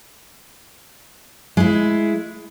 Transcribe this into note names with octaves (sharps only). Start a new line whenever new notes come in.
G#3 E4